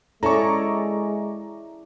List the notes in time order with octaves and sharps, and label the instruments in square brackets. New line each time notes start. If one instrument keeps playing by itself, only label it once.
[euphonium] G#3 [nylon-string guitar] C#4 A4 [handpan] E4 G#4 D5 [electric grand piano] A#5 C#6